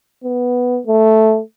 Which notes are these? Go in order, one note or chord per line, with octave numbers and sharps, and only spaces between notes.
B3
A3